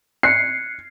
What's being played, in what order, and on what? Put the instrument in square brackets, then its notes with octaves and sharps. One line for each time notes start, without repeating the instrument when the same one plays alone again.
[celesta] F#6 C#7 [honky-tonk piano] C7